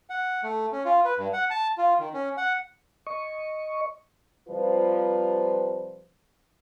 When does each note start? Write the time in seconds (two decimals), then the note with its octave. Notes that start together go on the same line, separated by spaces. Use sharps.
0.10 F#5
0.43 A3
0.72 C#4
0.85 F4
1.05 B4
1.18 G2
1.33 F#5
1.50 A5
1.78 F4
1.99 D#3
2.14 C#4
2.37 F#5
3.07 D#5 C#6
4.49 C3 F3 G3 F4 B4